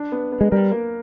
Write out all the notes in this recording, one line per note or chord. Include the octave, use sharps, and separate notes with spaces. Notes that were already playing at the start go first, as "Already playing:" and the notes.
Already playing: D4
B3
B3
G#3
G3 A#4
A#3